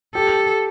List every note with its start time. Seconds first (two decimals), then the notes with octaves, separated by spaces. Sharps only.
0.15 G4 A4